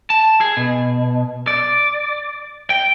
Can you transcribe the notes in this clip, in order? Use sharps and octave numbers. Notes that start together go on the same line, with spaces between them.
A5
G#4
B2
D5
G5